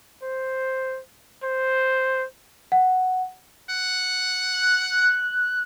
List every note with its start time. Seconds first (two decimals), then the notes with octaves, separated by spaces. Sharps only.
0.23 C5
1.43 C5
2.72 F#5
3.70 F#5
4.54 F#6